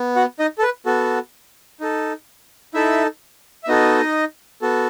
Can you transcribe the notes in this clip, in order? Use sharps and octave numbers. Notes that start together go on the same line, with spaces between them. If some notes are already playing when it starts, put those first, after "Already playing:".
Already playing: B3
F#4 F#5
D#4 D#5
A4
B4
B3 F#4 A4
D#4 A4
D#4 E4 A4 E5
E5
B3 D#4 F#4 A4 D#5
B3 F#4 A4